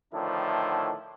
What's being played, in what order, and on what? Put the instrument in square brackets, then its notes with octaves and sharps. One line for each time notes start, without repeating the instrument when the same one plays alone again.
[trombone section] A2 D3 D#3 F3 D4 E4